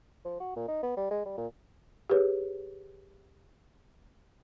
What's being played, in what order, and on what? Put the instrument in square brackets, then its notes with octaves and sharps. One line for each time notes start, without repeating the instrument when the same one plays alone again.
[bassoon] F3
F#4
A#2
D#4
B3
G3
G#3
G3
A#2
[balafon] G4 G#4 B4 C#5